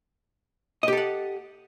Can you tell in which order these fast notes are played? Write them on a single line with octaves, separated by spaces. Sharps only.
D#5 G4 A4 F#5